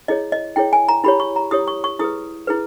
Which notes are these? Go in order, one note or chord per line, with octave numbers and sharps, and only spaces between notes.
E4 G#4 C#5 D#5
D#5
E4 G#4 C#5 G5
G#5
A#5
E4 G4 C#5 B5
C#6
A#5
E4 G4 C#5 D#6
C#6
C#6
E4 G#4 B4 D#6
E4 G#4 B4